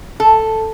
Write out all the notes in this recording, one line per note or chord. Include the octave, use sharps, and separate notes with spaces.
A4